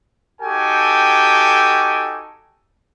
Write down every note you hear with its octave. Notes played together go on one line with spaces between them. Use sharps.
D#4 F#4 G4 A4 G5 G#5